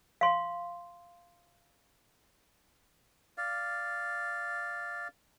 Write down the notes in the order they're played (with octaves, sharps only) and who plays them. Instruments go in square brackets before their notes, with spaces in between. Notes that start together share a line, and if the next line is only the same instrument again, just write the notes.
[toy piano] F5 C6
[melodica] D5 F5